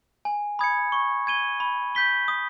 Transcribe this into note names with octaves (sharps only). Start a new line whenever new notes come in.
G#5
B5 D#6 G#6 C#7
C#6
G#6 D#7 G7
B5
G6 B6 G7
D#6